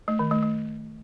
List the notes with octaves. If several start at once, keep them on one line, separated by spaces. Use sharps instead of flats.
A3
D#3
A3
A3